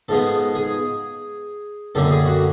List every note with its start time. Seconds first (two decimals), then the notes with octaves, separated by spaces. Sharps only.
0.09 G#2 F3 G#3 B3 A4
0.55 G#4
1.95 F#2 D3 G3 A#3 A4
2.10 G#4
2.26 F#4